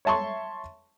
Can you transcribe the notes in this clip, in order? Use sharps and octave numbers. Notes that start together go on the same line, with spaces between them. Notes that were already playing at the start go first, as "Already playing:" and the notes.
C#5 E5 A5 C6 C#6